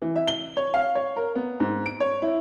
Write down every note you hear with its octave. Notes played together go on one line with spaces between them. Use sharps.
E3
E5
G7
C#5
F5
C#5
A#4
B3
G#2
D7
C#5
E4